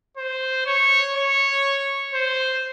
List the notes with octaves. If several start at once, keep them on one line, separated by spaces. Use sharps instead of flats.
C5
C#5
C#5
C5